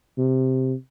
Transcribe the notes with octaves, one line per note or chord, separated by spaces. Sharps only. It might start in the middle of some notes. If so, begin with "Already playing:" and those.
C3